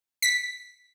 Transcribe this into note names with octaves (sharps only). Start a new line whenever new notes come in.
B6